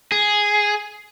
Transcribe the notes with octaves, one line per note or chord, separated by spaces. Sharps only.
G#4